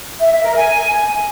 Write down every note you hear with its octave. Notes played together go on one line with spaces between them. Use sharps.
E5
E5
A#4
G#5